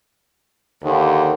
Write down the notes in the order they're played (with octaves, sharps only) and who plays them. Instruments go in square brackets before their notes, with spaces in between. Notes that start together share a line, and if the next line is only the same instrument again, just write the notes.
[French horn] D#2 [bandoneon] D3 D#3